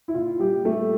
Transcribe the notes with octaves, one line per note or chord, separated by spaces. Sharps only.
E4
A#2 F4
G3 G4
A#2
A3 A4